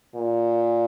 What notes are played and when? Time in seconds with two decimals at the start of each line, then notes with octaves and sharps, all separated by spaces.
0.15 A#2